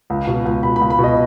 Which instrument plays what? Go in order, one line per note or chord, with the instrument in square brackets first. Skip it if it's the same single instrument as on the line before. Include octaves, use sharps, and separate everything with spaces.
[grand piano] C#2
B2
C#2
B2 B5
B5
C#2
B5
B2
D#5